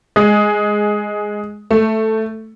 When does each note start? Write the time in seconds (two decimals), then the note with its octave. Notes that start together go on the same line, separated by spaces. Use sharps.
0.16 G#3
1.71 A3